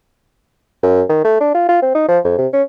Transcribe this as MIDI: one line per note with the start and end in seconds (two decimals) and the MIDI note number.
0.83 1.02 42
1.09 1.23 51
1.24 1.37 57
1.40 1.51 62
1.54 1.67 65
1.68 1.78 65
1.82 1.94 60
1.95 2.03 63
2.08 2.19 53
2.24 2.36 41
2.38 2.47 48
2.53 2.62 61